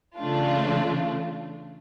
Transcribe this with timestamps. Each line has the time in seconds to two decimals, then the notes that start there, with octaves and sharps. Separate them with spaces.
0.18 C#3 E3 A3 D4 F4